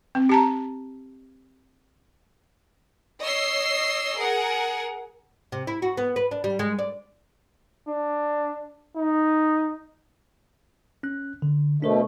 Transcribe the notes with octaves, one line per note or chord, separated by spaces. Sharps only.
C4
G4 A5 A#5
C#5 D#5 E6 C7
G#4 A#4 F#5
C3
E4
F#4
B3
B4
D4
G3
G#3
D5
D4
D#4
C#4 F#6
D3
B2 A3 D4 A#4 C5